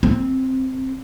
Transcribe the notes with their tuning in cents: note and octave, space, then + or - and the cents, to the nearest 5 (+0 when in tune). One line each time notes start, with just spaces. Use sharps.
C4 +0